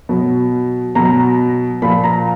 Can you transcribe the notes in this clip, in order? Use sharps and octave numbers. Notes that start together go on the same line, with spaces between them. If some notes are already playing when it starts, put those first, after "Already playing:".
B2 F#3
B2 F#3 A#5
A#2 F3 B5
A#5